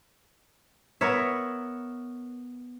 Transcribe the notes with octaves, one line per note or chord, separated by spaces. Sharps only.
B3 A#4 C#5 E5